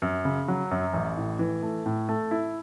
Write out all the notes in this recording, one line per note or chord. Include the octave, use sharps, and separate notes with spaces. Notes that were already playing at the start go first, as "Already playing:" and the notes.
F#2
C#3
F#3
F#2
A1
A2
E3
A3
A2
A3
E4